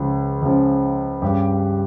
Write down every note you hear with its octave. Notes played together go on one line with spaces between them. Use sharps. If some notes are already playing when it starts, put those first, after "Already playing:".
Already playing: C#2 C#3 F3
C#2 C#3 F3
G2 G3 C#4 G4